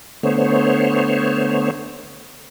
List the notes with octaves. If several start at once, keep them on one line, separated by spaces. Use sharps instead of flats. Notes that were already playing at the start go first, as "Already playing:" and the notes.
D3 A3 B3 C5 C#5